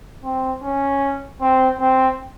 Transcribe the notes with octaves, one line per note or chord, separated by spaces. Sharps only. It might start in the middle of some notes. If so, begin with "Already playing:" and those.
C4
C#4
C4
C4